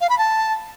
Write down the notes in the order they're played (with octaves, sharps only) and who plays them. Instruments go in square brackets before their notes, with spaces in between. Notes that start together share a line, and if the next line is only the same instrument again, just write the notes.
[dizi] F5
B5
A5